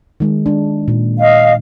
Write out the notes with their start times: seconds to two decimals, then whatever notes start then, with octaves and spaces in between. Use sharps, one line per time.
0.20 D#3 G#3
0.46 G#3 D4
0.88 A#2
1.19 D#5 F5